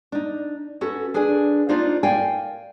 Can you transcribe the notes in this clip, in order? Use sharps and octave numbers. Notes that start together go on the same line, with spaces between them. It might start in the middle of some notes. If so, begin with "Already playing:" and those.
D4 D#4
C#4 F#4 A4 B4
D4 G#4 B4 D5 G#5
A#3 D4 D#4 F4 C5 D5
A#4 D5 F5 G5 G#5